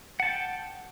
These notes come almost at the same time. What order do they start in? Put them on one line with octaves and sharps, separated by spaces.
F#5 A5 G5